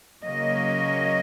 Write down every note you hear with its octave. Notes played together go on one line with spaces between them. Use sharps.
C#3 F#3 A#3 C#4 D#5